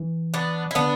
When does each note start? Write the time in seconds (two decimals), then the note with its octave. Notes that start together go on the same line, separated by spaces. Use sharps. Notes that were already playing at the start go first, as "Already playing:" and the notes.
Already playing: E3
0.34 B3 D4
0.71 E4
0.75 D3 B3 D4